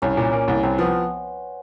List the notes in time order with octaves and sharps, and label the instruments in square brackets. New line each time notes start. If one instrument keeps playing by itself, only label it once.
[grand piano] C2 [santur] C#4
[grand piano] A#2
A#3
C2
[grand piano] C2 [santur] C4
[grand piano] F3 [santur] B3